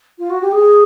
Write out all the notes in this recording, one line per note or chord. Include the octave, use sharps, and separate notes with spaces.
F4
F#4
G4
G#4